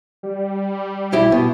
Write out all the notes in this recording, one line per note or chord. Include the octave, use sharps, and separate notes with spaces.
G3
B1 E4 G4
B2